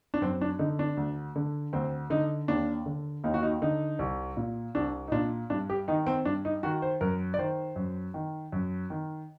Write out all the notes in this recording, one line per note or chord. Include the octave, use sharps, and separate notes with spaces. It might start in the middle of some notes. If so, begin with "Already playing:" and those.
D4
F#2 C4
D4
D3 D#4
D4
D2
D3
D2 C4
D3 D#4
D#2 D4
D3
D#2 D#4
F#4
D#4
D3 D#4
C2
A#2
C2 D4
D#4
A#2 D4
G2 D4
G4
D#3 D#4
C4
G2 D4
D#4
D#3 F#4
C5
F#2 A#4
D5
D#3 C5
F#2
D#3
F#2
D#3